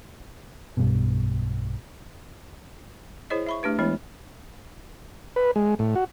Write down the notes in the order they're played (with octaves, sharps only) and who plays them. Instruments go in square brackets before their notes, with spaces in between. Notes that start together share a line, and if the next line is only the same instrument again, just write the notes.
[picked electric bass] B1 G2 B2
[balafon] E4 G#4 C5 C#5 D#5
E5 B5 C#6
A3 D4 G4 B4
E3 G#3 B3 E4 C#5
[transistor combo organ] B4
G#3
A2
F#4